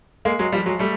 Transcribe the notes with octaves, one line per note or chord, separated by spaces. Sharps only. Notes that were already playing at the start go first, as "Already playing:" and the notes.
G#3 A#3
F#3 G#3
F3 G3
F#3 G#3
G3 A3